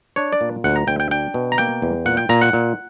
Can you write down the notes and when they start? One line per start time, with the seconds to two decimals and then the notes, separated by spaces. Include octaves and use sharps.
0.16 D4 C#5
0.33 D5
0.41 A#2
0.64 D2 F#5
0.76 A#5
0.87 D2 G5
1.00 G5
1.11 D4 G5
1.34 B2
1.52 A#5
1.58 A#3 G5
1.82 E2
2.06 A#2 F#5
2.17 G5
2.29 A#2 A#5
2.41 F#5
2.53 A#2